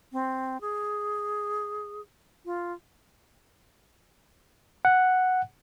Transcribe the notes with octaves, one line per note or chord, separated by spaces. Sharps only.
C4
G#4
F4
F#5